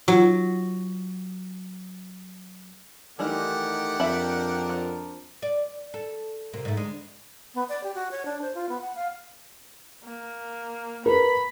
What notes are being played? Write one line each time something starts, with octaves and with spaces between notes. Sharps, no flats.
F#3 F4 F#4
D#3 E3 G3 A3 D#4 G4 D5 F#5
F2 D4 A#4 E5 B5
F3
D5
A4
C3 A#3
G#2 A3
D2 G#3
B3
D5
G4
F#4
C#5
D4
C5
F4
B3
F#5
F5
A#3
A#4 B4 B5